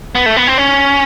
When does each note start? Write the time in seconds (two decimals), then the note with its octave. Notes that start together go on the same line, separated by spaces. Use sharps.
0.15 B3
0.26 A3
0.36 B3
0.47 C4
0.58 C#4